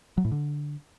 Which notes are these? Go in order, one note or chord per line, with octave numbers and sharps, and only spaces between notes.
F#3
A2
D3